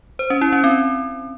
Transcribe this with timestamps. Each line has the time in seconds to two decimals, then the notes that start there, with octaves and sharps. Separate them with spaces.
0.19 C5
0.30 C#4
0.41 E4
0.53 C#4
0.64 C4